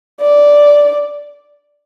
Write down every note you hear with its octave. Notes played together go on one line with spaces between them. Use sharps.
D5